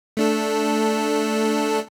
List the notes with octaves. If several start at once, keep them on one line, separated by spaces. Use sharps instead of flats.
A3 D4 A4